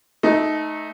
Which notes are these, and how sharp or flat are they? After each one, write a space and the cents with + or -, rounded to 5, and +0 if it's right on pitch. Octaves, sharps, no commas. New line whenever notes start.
A3 -20 D#4 +0